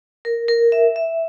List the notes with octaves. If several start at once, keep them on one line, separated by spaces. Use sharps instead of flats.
A#4
A#4
E5
E5